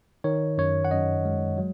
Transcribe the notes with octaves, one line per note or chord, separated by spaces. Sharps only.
D#3 C#5
F#2 C#5
F#5
F#2 D#5
G#3
F#3